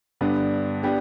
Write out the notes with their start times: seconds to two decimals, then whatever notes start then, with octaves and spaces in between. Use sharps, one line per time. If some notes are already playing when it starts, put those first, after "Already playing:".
0.21 G2 D3 B3 D4
0.83 B3 D4 G4